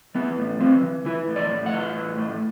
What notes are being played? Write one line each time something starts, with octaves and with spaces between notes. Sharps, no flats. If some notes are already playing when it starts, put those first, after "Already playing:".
E3 B3
A2
E3 C4
E3
E3 E4
A2
D5
A2
F#5
E3
A2
A2